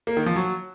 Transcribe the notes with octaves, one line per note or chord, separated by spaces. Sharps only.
A#3
D#3
F3
F#3